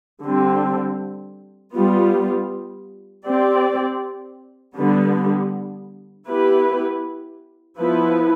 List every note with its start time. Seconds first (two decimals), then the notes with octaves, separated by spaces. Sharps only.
0.23 D3 G3 C4
1.74 G3 B3 F4
3.25 C4 G4 D5
4.77 D3 G3 B3
6.28 B3 E4 G4 B4
7.79 F3 B3 E4 B4